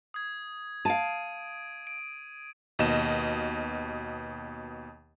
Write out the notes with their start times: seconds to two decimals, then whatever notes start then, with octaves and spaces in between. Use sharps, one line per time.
0.14 D#6 G#6
0.85 F5 A5 D7 D#7
1.87 D7
2.79 D#2 B2 D#5 E7